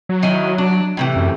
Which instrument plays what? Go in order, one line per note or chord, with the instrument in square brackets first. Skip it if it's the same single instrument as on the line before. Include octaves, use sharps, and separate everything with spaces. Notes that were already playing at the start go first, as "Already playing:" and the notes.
[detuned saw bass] F#3
[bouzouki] D#3 E4 G#5
D4
A2 C3 E3
[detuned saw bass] F#2